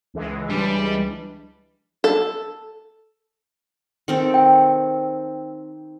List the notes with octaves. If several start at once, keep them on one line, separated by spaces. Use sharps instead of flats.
C#2 E3 G#3
G3 D4 B4
A4
D#3 C4 A4
G5